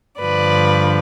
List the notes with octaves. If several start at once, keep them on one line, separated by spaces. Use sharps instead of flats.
G2 D3 F3 B4 D5